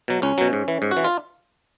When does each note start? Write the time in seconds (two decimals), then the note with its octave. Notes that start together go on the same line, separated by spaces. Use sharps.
0.08 B2 F#3
0.22 C#2 C#4
0.38 B2 F#3
0.53 G#2
0.68 E3
0.82 G#2
0.91 F#4
0.97 E3
1.04 F4